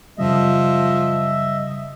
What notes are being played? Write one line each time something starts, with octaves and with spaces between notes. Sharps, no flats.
F#2 C#3 F3 G3 D#5 E5